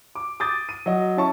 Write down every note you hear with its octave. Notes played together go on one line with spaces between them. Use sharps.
D6
D6 D#6 G6 A6
D#7
F#3 D#5
C#4 E4 A5 C#6